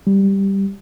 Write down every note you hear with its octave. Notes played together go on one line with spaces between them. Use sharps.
G3